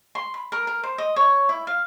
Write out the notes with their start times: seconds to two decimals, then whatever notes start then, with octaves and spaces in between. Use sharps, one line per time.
0.15 C6
0.34 B5
0.52 A#4
0.67 A#4
0.83 C5
0.98 D#5
1.16 C#5
1.49 E4
1.67 F5